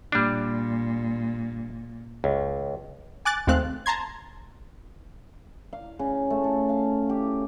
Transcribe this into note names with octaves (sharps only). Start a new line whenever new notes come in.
A#2 G3 D4
C#2
G#5 D6 F#6 A6
D#2 G#3 A3 C4 F5 F#6
A5 A#5 C6 G#6
F5
C#3
A3
A4
F5
G4